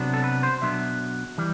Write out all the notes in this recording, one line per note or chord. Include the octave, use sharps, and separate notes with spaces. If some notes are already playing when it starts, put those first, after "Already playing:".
Already playing: C3 F#3 B3 D4
A4
B4
C5
B2 F#3 B3 D4 E5
E3 G3